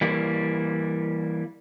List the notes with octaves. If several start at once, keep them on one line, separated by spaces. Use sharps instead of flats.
E3 G3 A#3